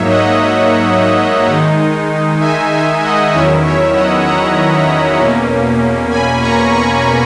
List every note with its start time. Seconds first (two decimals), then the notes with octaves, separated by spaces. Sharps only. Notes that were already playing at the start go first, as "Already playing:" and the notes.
Already playing: G#2 F#3 A#3 D#4 C#5 E5
0.08 D#5 F#5
1.47 D#3 G#3 D#4
2.40 E5 G#5
2.71 E5 G#5
3.02 D#5 F#5
3.33 E2 D#3 F#3 C#4 E4 C#5 E5
3.64 C#5 E5
3.95 D#5 F#5
4.25 F#5 A#5
5.18 E2 B2 A#3 C#4
6.11 G#5 B5
6.41 A#5 C#6
6.73 A#5 C#6